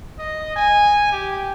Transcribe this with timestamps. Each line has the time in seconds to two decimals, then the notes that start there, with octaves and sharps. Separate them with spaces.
0.19 D#5
0.56 G#5
1.12 G4